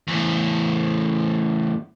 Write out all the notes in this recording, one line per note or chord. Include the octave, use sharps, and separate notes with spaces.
E2 A2